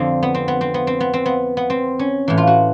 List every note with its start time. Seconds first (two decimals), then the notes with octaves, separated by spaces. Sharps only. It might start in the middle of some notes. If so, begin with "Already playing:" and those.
Already playing: F2 D3 C4
0.23 B3
0.35 C4
0.48 B3
0.61 C4
0.74 B3
0.87 C4
1.00 B3
1.14 C4
1.26 B3
1.57 B3
1.70 C4
1.99 C#4
2.28 A2 E3
2.38 F4
2.47 F#4